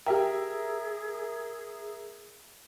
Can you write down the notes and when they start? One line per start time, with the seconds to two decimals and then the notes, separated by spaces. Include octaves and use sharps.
0.06 G4 G#4 A#4 E5 G5